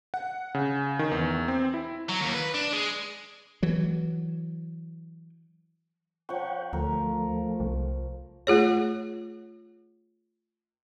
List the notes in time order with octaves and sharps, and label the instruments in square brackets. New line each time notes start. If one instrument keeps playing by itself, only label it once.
[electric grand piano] F#5
C#3
D#3
E2
C4
E4
[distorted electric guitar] F#3
D#2
B4
D4
G#3
[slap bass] E3 F#3
[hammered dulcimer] F3 C#6 [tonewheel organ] C#5 F#5 G5
[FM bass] D2 [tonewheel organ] F3 A3 [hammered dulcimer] A#4
[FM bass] C2
[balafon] A3 F4 G#4 C#5